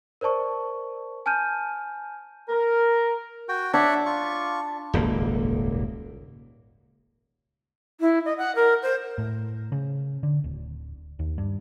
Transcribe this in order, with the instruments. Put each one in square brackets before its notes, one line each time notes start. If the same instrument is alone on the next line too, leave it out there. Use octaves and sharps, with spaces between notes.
[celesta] A#4 C5 D5 A5 C#6
G#5 A5 F6 G6 D#7
[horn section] A#4
[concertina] F#4 G5
[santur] D4 [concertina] C#5 E5 F#5
[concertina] F4 C#6
[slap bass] D#1 G#1 C#2 A#3
[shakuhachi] E4
D#5
F#5
A#4
C5
[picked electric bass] A2
C#3
D3
D1
D#2
G2